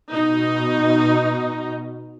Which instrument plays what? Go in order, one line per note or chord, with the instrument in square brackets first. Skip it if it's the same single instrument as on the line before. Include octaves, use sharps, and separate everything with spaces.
[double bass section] B2 [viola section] D#4